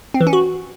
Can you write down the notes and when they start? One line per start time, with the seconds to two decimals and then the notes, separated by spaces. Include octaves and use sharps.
0.14 C4
0.21 E3
0.27 C#4
0.33 F#4